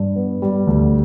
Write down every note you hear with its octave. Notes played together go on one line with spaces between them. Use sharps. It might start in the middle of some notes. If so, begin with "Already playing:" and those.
Already playing: G2
B3
G3
D2